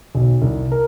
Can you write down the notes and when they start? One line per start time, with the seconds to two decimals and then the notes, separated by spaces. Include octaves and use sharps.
0.15 B1
0.42 C2
0.72 A#4